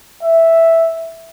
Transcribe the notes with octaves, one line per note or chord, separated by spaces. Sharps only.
E5